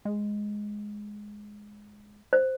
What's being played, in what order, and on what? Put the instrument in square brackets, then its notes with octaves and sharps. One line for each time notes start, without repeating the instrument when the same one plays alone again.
[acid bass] G#3
[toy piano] C5